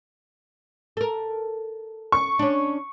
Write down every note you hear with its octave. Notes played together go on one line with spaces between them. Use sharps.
A4 A#4
C#6
C#4 D4